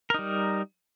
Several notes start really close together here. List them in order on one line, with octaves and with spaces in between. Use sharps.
A#4 D#4 G3